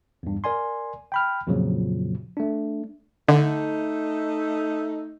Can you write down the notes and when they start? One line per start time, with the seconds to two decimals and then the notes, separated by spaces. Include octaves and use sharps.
0.23 E2 G2
0.44 A#4 D5 G#5 C6
1.12 G5 B5 F6
1.47 F2 A#2 C#3 F3 F#3
2.37 A3 D4
3.28 D3 A3 D#4